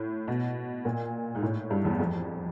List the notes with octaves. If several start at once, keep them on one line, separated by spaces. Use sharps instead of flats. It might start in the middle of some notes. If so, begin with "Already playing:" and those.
Already playing: A2
B2
A#2
G#2
A2
G2
E2
F2